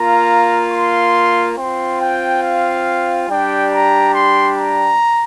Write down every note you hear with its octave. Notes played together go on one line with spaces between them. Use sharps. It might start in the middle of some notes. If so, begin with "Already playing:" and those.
Already playing: A#3 F4 A#5
C6
C4 F4 C6
G5
F5
G3 D4 G4 G5
A#5
C6
A#5